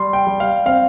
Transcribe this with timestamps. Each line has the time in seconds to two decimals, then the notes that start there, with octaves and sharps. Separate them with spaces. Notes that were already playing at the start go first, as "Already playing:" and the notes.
Already playing: G3 C6
0.13 G5
0.27 G3
0.40 F5
0.66 C4 F5